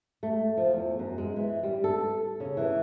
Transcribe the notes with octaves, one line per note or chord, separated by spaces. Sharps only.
A3
F3
E2
F#2
G#3
E3
G3
A4
C#3
E3